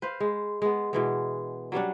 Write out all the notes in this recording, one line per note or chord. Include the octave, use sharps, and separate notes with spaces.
B4 C5 F5
G#3
G#3 B3
B2 E3 G#3
F#3 G3 C#4 D4